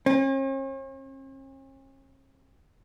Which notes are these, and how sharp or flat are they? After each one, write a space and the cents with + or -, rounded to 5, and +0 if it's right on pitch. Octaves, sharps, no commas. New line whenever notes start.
C#4 -45